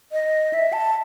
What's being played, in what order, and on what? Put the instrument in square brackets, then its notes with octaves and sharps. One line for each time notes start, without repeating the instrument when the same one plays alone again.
[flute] D#5
E5
A5